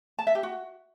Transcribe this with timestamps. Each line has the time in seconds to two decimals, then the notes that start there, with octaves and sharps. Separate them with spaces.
0.19 A5
0.27 E5
0.35 G4
0.43 F#4